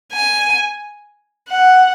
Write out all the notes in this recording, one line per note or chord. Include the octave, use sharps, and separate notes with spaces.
G#5
F#5